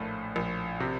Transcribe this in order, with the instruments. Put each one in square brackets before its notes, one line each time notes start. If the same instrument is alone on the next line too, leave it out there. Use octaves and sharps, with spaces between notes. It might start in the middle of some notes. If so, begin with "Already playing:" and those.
Already playing: [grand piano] A#1 A2 F3 [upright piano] A3
[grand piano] A#1
C3